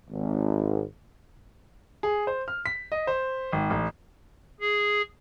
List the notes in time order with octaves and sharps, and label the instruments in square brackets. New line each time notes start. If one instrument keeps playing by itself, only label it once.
[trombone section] G#1
[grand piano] G#4
C5
F6
B6
D#5
C5
G#1
A1
[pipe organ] G#4